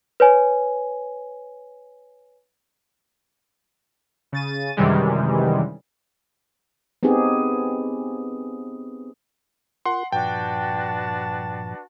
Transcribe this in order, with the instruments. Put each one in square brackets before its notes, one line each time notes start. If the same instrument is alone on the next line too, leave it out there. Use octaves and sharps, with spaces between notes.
[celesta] B4 C#5 G#5
[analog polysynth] C#3 A6 D#7
F#2 C3 D#3 E3 G3 G#3
[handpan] B3 C4 D#4 G4 G#4
[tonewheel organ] F4 A#4 [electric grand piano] F#5 C6
[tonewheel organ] G2 A#2 F3 [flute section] D4 F#4 B4 [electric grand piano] G5 [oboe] A5